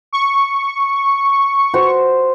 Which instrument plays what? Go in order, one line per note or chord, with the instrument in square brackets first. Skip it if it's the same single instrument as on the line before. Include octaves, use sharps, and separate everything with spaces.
[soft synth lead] C#6
[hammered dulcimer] F#4 C5